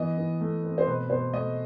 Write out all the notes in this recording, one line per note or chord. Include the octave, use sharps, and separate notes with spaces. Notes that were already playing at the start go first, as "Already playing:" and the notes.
Already playing: E3 B3 D#5
E3
A3
C4
C5
B2 B4
B2 C5
A3 D#5